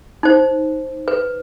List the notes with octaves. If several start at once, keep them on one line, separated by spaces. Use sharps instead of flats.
D#4 C5
B4